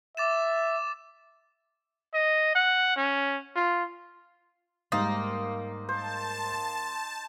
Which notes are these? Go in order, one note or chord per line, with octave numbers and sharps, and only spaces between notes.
E5 D6 A6 E7
D#5
F#5
C#4
F4
G#2 G3 A#3 D#4 C5 D#6 A6
C5 A5